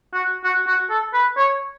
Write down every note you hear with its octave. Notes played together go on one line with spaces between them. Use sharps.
F#4
F#4
F#4
A4
B4
C#5